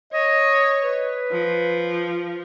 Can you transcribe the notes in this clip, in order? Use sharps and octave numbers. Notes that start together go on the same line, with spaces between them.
C#5 D#5
B4
F3